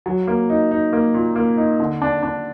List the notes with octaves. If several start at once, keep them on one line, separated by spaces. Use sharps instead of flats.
F#3
A#3
D#4
D#4
A#3
A#2
A#3
D#4
D3
D4
D4